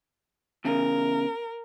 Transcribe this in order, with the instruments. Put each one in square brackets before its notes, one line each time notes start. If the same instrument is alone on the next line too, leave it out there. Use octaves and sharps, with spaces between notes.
[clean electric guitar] E2 C#3 [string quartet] A#4